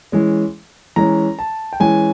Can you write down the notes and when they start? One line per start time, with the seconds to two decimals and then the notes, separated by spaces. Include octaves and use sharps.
0.12 E3 G#3 C#4
0.96 E3 G#3 C#4 A#5
1.39 A5
1.73 G5
1.80 E3 G#3 C#4 G#5